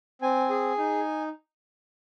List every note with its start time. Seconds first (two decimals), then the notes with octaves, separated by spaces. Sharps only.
0.22 C4 G#5
0.49 G#4
0.78 D#4